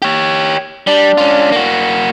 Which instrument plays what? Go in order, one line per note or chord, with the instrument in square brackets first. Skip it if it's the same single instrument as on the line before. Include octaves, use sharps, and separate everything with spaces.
[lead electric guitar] G4 C#5
[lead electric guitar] G3 [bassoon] D4
[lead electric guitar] C#4 F4
A#3 F#4